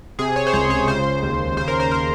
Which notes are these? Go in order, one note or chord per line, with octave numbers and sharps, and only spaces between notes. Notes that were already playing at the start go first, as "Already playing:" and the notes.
C3 G#4
C#5
C5
C#2 C#5
C#5
C#3 C5
D#2
C#3 C5
A#4
C5
A#4